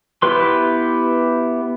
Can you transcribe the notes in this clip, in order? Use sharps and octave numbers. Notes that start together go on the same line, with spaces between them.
B3 E4 G4 B4 C6